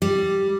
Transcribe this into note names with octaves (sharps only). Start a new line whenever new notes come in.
G3